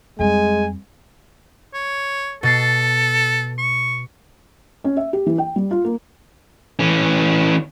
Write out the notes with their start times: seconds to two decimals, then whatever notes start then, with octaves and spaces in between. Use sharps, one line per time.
0.19 F2 G3 G#3 G#5
1.74 C#5
2.43 B2 A4 A6 C7
3.58 C#6
4.84 C#4
4.97 E5
5.13 G4
5.26 E3
5.38 G5
5.56 G3
5.71 F4
5.84 A#3
6.79 E3 C#4